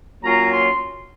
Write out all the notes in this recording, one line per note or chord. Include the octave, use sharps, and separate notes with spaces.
A#2 F#3 C#4 F4 A#5
C6